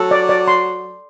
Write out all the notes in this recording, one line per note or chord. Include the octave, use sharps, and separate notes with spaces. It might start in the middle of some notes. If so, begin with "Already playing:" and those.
Already playing: F#3 A4
D5
D5
C6